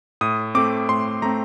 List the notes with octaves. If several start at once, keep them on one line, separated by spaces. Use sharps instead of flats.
A2 D#6
A3 C4 D6
A2 C6
A3 C4 A#5